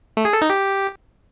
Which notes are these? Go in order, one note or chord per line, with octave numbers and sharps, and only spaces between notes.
A3
G#4
A4
D#4
G4